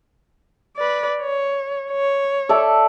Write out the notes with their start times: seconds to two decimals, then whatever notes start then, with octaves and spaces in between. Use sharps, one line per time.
0.77 B4 D5
1.21 C#5
1.91 C#5
2.49 A4 D5 E5